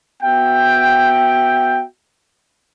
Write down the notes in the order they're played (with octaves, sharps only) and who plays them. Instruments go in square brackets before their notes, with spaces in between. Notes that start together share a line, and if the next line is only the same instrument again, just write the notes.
[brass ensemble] B3 F#4 E5 G5